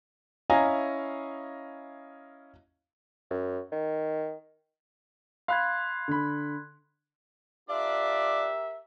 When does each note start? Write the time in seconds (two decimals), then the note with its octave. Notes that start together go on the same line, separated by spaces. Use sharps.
0.50 C#4 E4 D#5 F5 G#5 A#5
3.31 F#2
3.72 D#3
5.48 F5 B5 C6 F#6 G#6
6.08 D3 B5
7.69 D4 F4 G4 A#4 D5 E5